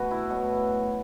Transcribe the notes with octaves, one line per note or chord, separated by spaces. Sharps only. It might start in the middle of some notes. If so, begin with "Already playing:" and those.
Already playing: B2 A3 F#4 B4
E4
B2 F#3 A3